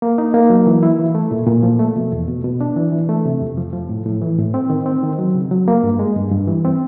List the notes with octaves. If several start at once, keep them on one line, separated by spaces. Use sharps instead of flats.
A#3
D#4
A#3
F#3
E3
E4
E3
A3
A#2
A#2
F3
A3
B2
E2
B2
B2
D4
E3
E3
A3
C3
F2
F3
F3
A2
A2
E3
A2
C4
D#3
C4
D#3
F#3
C#3
F#3
A#3
G2
G#3
G2
G2
E3
C4